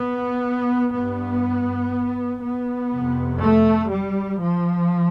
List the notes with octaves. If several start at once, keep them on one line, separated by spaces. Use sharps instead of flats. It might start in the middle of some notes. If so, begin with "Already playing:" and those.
Already playing: B3
G2 B3
B3
F2 C3
A3
G3
F3